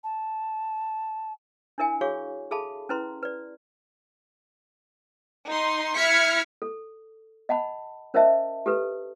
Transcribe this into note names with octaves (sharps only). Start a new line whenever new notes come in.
A5
D4 E4 A#4 E5 G#5
F#4 G#4 C#5 F5 C#6
G#4 A4 E5 F5 A5 B5
C#4 E4 B4 A#5 C6
B4 D5
D#4 C6
E4 F6 G#6 B6 C#7
A4
D#5 F#5 A5 B5
C#4 A#4 C5 D#5 E5 A5
G4 A4 B4